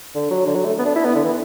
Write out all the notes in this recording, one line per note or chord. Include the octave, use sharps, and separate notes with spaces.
D3
F#3
D3
F#3
A3
B3
D4
E4
B3
D3
E3